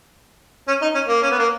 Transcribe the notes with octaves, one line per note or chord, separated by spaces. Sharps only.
C#4
D#4
C#4
A#3
C#4
B3
A#3